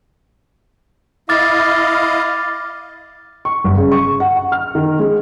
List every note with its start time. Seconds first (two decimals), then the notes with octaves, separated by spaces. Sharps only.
1.29 E4 D#5 F5 D6 F6 A6
3.45 C#6
3.64 G1
3.77 C#3
3.92 C#6
4.20 F#5
4.37 F#5
4.52 F6
4.75 D#3
4.99 G#3